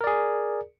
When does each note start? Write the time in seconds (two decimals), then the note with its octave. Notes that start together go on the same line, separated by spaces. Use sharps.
0.01 A#4
0.04 D5
0.07 G#4